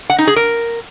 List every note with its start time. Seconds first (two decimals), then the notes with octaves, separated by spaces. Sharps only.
0.10 F#5
0.18 D#4
0.27 G#4
0.36 A#4